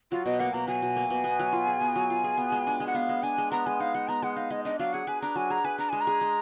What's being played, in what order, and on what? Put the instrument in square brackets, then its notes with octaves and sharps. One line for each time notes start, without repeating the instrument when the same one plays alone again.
[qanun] F#3 [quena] F4
[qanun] B2 [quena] D#5
[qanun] A#3 [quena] F#5
[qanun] B2 [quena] A#5
[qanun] F#3 [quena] G#5
[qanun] B2
A#3
B2
B3
F#3
F4
G#4
B3
F#3
F4
G#4
B3
G#3
D4
G#3
[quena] F#5
[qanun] B3 [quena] F5
[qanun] G#3
[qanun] D4 [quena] G#5
[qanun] G#3
[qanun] B3 [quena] A#5
[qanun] G#3 [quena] G#5
[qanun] D#4 [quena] F5
[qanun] G#3 [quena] F#5
[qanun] B3 [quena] A#5
[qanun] G#3 [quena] F#5
[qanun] D#4 [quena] F5
[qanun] G#3 [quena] D#5
[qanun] D4 [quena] D#5
[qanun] F#3 [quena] F5
[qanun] G#4 [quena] F#5
[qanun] B4 [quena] G#5
[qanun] D4 [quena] A#5
[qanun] F#3 [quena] G#5
[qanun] G#4 [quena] A#5
[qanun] B4 [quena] G#5
[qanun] D4 [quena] A#5
[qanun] G#3 [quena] G#5
[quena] A#5
[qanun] G#4
G#3